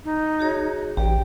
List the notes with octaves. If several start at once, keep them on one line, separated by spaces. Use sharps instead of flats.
D#4
F#4 G#4 C#5
A1 G4 G5